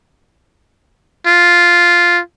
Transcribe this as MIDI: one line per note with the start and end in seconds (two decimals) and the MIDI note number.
1.27 2.20 65